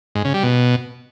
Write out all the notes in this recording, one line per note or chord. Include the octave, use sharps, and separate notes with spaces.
G#2
C#3
G3
B2